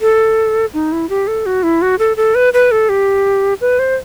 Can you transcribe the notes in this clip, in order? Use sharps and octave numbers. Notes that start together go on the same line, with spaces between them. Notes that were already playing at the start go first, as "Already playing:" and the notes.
A4
D#4
E4
G4
A4
F#4
E4
F#4
A4
A4
B4
B4
A4
G4
B4
C5